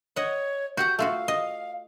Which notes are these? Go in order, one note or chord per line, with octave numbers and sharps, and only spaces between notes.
C#5 D#5 F#5
F#4 G4 F#5 G6
A3 F4 F#4 F5
D#5